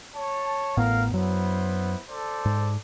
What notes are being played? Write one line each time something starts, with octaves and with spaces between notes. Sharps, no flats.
C#5 A5
A1 A2 B3 A#4 F5
F#2 F#3 B3 E4 C5
A4 C5 D5
G#2